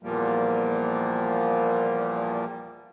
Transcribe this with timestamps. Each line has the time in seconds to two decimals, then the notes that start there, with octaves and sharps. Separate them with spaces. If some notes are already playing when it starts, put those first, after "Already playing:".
0.03 E2 A#2 F3 G3 A#3